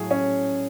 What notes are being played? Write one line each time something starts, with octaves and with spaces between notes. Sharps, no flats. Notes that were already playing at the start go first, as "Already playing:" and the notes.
Already playing: A2 F#3 G#4
C#4